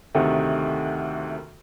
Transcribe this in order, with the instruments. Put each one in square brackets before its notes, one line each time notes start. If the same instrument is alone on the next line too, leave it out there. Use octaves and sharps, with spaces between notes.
[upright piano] D2 C3 D#3 A3